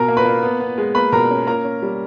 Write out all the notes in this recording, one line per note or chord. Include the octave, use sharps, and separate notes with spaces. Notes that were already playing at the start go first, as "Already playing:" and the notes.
Already playing: B2 A#4 A#5
A#3
B4 B5
A#3
B3
B3
G#3
A#3 B4 B5
B2 A#4 A#5
C#4
A#3 A#4 A#5
C#4
G3